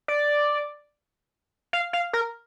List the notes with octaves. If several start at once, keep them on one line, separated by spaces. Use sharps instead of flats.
D5
F5
F5
A#4